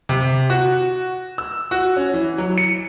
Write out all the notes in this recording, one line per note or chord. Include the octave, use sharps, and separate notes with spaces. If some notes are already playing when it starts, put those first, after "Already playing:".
C3
F#4
E6
F#4
C#4
E3
F#3
C#7